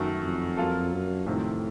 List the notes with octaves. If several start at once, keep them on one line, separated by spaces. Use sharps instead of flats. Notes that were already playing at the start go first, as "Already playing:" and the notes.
Already playing: F#2 D#3 A3
F2
F#3 A#3 F4 A4
F#2
F2 A2 C3 D#3 F#3 C4